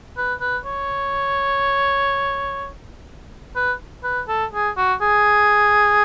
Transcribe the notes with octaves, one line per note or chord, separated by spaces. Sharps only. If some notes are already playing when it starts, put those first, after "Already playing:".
B4
B4
C#5
B4
B4
A4
G#4
F#4
G#4